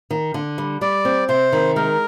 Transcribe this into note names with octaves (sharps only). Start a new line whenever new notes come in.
D#3
D3
G3
G3 D5
C4
C3 C5
D#3
G#3 A#4